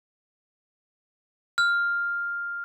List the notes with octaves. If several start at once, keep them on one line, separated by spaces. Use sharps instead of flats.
F6